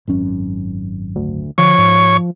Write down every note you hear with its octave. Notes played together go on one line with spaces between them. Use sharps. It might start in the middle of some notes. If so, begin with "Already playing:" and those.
G#1 F#2 C#4
D2
D3 F3 C#5 C#6
G#2